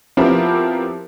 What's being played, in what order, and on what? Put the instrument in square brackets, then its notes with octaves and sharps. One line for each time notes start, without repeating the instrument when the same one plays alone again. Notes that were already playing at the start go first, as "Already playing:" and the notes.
[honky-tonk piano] F3 B3 C4 E4 G4 A#4